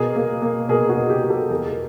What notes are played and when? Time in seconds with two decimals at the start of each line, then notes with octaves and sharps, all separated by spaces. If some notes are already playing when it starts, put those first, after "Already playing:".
Already playing: B2 G#4 A#4
0.16 A#3
0.42 A#3
0.69 B2 G#4 A#4
0.89 F#4 G#4
0.97 B2
1.10 G4
1.24 B2
1.30 G4 A4
1.50 E2 G#4 A#4